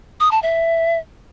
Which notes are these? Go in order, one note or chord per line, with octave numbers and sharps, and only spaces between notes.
D#6
A5
E5